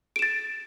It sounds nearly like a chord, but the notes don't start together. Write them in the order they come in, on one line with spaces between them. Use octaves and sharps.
D7 E7 A6